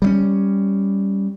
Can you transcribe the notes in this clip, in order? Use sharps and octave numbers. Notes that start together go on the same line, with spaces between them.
G3 G#3 C#4